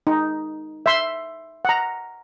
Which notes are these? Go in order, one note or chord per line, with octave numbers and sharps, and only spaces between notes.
D#4
E5 C6
F#5 A#5